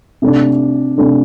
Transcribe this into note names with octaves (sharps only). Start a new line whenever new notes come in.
C3 A3 D4
C3 A3 D4